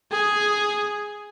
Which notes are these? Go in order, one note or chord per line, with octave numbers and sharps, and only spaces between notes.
G#4